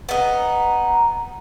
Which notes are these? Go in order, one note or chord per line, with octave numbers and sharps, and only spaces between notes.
B3 D#4